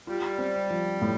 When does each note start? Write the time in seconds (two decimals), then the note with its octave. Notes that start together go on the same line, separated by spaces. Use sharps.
0.07 G3 F4
0.38 C4
0.70 F3
1.01 A2